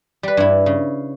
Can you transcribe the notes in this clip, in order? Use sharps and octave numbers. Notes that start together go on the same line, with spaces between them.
G3 B4
G2 E4
C#3